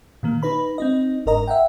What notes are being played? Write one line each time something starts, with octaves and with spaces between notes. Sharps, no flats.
A#2 D#3 A#3
D#4 B4 B5
C4 D#4 D#5
G1 G#2 A#4 D#5 A#5
E5 F#5 G5